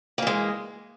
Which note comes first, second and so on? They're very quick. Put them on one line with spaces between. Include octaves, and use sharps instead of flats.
A#3 E3 G#3